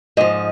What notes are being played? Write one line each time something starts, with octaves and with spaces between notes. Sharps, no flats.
G#2 F3 D#5